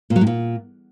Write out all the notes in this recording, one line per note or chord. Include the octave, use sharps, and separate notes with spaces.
A#2
F#3
A2
A#2